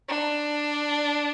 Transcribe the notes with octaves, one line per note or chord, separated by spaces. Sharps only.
D4